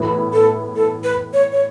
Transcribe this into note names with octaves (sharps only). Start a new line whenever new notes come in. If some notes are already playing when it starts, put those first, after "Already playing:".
Already playing: A2 E3 B3 E4
A4
A4
B4
C#5
C#5